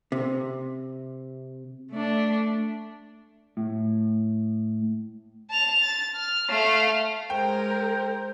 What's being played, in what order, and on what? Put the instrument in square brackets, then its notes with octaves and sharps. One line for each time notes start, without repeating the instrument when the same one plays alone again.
[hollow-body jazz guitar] C3
[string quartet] A3 D4
[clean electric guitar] A2
[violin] A5 F7
A6
F6
A3 F5
[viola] G#3 A#4 [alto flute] C5 [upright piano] G5